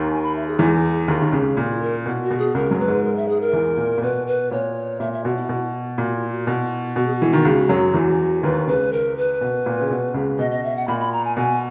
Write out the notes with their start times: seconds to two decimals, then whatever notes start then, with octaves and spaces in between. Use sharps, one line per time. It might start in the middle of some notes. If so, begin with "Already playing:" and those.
Already playing: D#2 D#3
0.09 G#5
0.22 B5
0.35 E5
0.47 G#4
0.59 E2 E3
1.08 D#2 D#3
1.22 D#3
1.32 C#2 C#3
1.57 A#2 G#4
1.70 E4
1.82 A#4
2.06 B2 E4
2.23 F#4
2.31 B2
2.38 G#4
2.55 C#2 C#3 A#4
2.71 F#2 F#3
2.79 B4
2.88 G#2 G#3
3.03 A#4
3.16 E5
3.28 G#4
3.40 A#4
3.53 E2 E3
3.77 A#2
3.98 A#2
4.02 B2 B4
4.27 B4
4.51 A#2 C#5
4.99 A#2 E5
5.12 E5
5.24 B2 F#4
5.36 E4
5.49 B2
5.98 A#2 F#4
6.14 E4
6.31 F#4
6.47 B2 E4
6.96 B2 F#4
7.06 G#4
7.15 F#4
7.22 E3
7.33 D#3
7.45 C#2 C#3
7.69 F#2 F#3
7.94 E2 E3
8.43 D#2 D#3 B4
8.67 C#2 C#3 B4
8.92 A#4
9.17 B4
9.41 B2
9.66 A#2
9.80 C#3
9.90 B2
10.14 C#2 C#3
10.39 B2 D#5
10.51 D#5
10.63 E5
10.76 F#5
10.87 A#2 B5
11.00 B5
11.12 A#5
11.24 G#5
11.37 B2 G#5